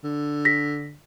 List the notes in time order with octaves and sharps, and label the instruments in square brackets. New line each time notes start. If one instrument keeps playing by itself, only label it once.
[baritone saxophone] D3
[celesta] A#6 B6